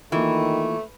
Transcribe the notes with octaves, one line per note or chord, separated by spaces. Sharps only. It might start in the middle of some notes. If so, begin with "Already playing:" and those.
D#3 E3 A3 A#3 F4